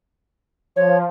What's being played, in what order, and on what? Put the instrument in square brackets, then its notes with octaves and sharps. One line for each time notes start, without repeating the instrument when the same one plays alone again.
[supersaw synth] F3 [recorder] C#5